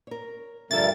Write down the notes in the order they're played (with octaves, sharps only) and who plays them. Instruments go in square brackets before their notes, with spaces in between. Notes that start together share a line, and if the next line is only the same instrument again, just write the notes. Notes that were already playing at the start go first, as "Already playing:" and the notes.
[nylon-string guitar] A#4 C#5
[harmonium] G2 G3 A#4 [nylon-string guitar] D3 F3 A4 [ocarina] E5 [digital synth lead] A6